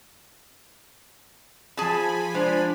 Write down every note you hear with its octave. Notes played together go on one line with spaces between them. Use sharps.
F3 G#4 G#5 A5 B5
G#3 D4 C5